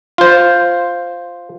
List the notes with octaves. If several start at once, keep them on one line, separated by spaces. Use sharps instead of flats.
F4 C5